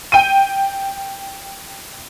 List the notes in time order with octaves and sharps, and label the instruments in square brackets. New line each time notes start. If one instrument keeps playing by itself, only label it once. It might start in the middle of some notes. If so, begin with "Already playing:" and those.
[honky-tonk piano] G5 D#7